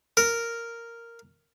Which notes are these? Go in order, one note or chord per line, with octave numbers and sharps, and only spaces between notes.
A#4